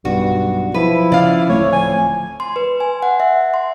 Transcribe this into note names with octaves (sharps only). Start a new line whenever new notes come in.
B1 G2 F#4
F3 E4 B4
C#3 D5 F5
D1 A3 C4 C#5
F3 G#5
C6
B4
G#5
F#5
E5
C6